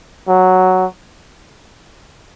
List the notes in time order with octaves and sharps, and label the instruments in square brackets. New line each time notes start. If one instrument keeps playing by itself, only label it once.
[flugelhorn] F#3